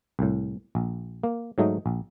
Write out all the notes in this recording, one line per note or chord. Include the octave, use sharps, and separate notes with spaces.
C2 A2
A#1
A#3
G#2 F#3 A3 D#4
A#1